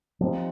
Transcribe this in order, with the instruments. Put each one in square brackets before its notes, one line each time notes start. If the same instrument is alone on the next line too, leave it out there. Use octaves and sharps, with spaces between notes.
[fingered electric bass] F3 [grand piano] G3 C4 D#4